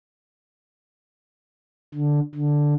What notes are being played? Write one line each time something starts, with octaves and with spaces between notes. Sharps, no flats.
D3
D3